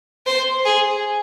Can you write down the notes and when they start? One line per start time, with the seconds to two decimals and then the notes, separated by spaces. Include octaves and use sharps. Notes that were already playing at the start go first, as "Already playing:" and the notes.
0.26 C5
0.65 G#4